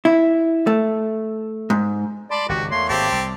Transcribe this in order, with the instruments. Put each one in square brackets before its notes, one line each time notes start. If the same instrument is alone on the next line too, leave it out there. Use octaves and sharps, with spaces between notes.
[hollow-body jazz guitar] E4
A3
G#2
[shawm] D5 [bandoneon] A5 B5 C6
[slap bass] G#1 C#2 G#2 [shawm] F#4 [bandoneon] G4
[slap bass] E2 [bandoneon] A3 A#3 C#5 [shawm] C6
[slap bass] G#1 [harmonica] C4 G4 [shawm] A5
[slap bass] C2 [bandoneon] D6